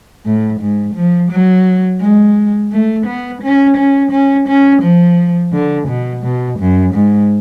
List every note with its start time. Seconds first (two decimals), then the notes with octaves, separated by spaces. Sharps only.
0.26 A2
0.60 G#2
0.95 F3
1.31 F#3
2.01 G#3
2.72 A3
3.06 B3
3.43 C#4
3.77 C#4
4.12 C#4
4.48 C#4
4.82 F3
5.53 D3
5.88 B2
6.23 B2
6.59 F#2
6.94 G#2